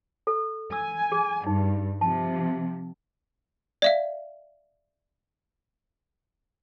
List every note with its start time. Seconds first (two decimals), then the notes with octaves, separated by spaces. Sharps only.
0.27 A4
0.72 G#5 E6
1.12 G#4
1.47 G2 D#4
2.01 C3 F3 A5
3.82 D5 E5 F5